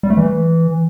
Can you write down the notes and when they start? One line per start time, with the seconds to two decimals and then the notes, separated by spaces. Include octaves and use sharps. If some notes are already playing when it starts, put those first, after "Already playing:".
0.03 G3
0.10 A3
0.17 E3